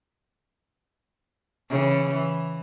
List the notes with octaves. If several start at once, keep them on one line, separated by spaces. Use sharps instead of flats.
C#3 E3
E3